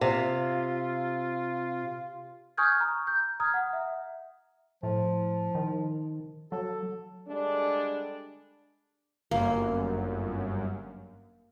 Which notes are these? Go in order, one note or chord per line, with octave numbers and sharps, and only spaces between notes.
C3 F4
G#5 C#6 D#6 F6 G6 G#6
A#5
G6
A#5 D#6 F6 G#6
F#5
E5
A2 F3
D#3
F#3 A4
D3 G3 G#3 D4
G1 F#2 A#3